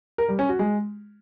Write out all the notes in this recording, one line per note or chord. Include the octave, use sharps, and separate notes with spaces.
A#4
G3
C#4
F#4
G#3